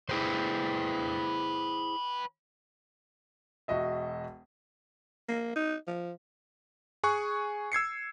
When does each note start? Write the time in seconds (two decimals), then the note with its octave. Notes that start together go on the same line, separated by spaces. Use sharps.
0.09 E4 G#4 B4 C5 G5
3.68 E1 F#4 D#5 E5
5.29 A#3
5.56 D#4
5.88 F3
7.04 G#4 G#5 C#6 F#6
7.72 E6 G#6 C7 C#7